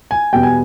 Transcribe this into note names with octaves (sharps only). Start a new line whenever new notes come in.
G#5
E2 B2 G3 B3 G5
G#5